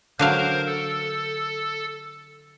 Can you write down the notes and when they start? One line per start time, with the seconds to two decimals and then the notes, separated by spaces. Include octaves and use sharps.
0.19 D3 F#3 A#4 C5 F5
0.66 A4